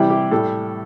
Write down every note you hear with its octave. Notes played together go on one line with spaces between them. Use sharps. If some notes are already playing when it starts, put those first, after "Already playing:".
Already playing: C3 E3 G3 E4
G4
A2 G3 A4